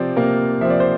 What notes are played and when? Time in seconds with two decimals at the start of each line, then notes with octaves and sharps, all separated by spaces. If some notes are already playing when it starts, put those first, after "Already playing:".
Already playing: C3 F3 C4 D5
0.16 C3 A#3 A#4
0.61 F3 C4 E5
0.70 D5
0.80 C5